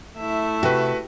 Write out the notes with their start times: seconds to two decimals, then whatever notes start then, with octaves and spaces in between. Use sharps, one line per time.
0.17 A3 E4 E5
0.63 C3 F#4 B4